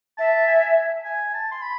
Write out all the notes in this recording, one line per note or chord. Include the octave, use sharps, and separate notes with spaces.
E5 A5
G#5
G#5
A5
C6
B5